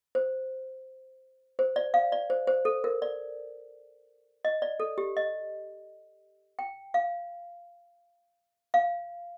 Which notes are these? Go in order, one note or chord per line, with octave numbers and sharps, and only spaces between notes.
C5
C5
D5
F5
D5
C5
C5
A4
A#4
D5
D#5
D5
A4
G4
D#5
G5
F5
F5